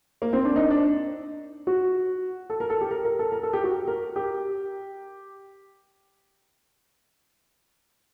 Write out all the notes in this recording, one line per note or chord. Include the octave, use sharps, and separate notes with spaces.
A#3
C4
D4
D#4
D4
F#4
A4
A#4
A4
G4
A#4
A#4
A4
A#4
A4
G4
F#4
A#4
G4